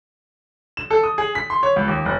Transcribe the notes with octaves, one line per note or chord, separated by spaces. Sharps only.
E7
A4
D#6
G#4
B6
C6
C#5
C#2
D#2
F#1